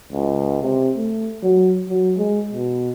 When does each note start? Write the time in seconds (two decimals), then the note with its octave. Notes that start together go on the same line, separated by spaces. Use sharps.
0.12 C#2
0.62 C3
0.96 A3
1.42 F#3
1.89 F#3
2.18 G#3
2.52 B2